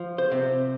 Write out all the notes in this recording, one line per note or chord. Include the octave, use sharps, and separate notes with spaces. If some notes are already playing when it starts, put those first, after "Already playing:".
Already playing: F3
C5
C3